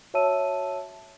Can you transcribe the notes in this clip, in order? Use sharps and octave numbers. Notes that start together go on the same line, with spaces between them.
F#4 C#5 E5 A5 E6 D#7